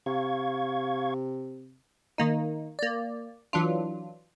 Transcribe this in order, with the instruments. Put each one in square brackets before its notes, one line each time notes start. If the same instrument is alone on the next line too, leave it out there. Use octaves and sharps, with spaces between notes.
[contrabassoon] C3 [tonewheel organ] F5 C#6 G#6
[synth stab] D#3 A#3 D#4
A#3 D5
E3 F#3 D4 F4